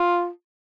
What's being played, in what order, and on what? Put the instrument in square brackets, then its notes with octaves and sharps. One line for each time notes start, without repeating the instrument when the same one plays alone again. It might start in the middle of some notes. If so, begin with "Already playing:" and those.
Already playing: [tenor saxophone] F4